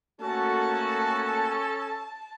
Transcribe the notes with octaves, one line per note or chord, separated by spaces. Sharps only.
A3 A#3 C#4 F#4 A4 A5